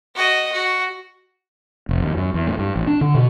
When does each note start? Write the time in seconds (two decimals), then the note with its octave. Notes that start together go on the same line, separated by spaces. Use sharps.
0.16 F#4 D#5
0.53 F#4
1.89 F1
2.02 D#2
2.17 F#2
2.34 E2
2.47 A2
2.59 G2
2.76 A1
2.87 D4
3.01 D3
3.15 B2